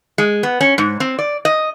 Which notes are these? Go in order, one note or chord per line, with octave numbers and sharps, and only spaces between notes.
G#3
B3
C#4
G#2
C4
D5
D#5